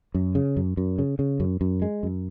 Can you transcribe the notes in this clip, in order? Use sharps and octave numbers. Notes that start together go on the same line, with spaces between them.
F#2
C#3
F#2
F#2
C#3
C#3
F#2
F#2
G#3
F#2